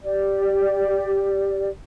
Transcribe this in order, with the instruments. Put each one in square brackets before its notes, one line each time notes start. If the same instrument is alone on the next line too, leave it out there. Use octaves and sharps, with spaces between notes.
[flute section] G4 D5